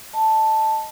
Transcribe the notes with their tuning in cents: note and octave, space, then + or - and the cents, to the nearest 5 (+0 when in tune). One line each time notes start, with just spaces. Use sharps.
D#5 +0 A5 +0